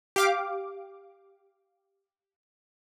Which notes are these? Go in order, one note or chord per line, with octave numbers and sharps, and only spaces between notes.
G4 F5 D6